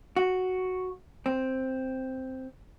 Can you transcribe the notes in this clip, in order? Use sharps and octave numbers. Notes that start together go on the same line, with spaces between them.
F#4
C4